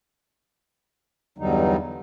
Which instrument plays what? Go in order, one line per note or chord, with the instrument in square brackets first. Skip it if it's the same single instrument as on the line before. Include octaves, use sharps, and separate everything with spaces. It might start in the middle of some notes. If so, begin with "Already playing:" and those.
[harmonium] E2 G2 D3 F#3 G3 D#4